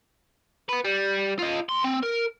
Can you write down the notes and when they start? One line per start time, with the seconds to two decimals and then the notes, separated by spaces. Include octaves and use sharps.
0.69 B3 B4
0.84 G3
1.39 F4 D#5
1.69 E2 C6
1.84 C4
2.03 A#4